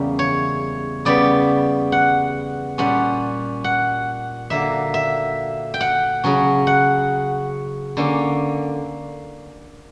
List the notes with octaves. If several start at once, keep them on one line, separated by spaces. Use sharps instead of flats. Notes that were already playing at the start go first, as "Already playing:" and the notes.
Already playing: E2 C#3 G3 A#3 A#4
C#5
C#3 G3 B3 D5
F#5
A#2 G3 C#4 F#5
F#5
D3 F#3 A#3 E5
E5
G5
F#5
C#3 F#3 C#4
F#5
D3 A#3 C#4